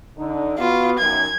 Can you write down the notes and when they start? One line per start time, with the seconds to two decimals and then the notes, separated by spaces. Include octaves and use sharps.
0.19 D3 D#4
0.59 B3 F4 F#4
1.00 F#2 D#3 F#3 G#6